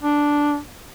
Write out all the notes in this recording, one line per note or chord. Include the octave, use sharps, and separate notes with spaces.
D4